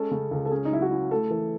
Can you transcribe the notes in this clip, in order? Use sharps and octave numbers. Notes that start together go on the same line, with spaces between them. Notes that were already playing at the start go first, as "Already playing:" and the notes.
Already playing: G#3 C#4 A4
C#3
C#2
A4
C#4 G#4
D#4
F#3 E4
F#4
E4
A3 A4
E3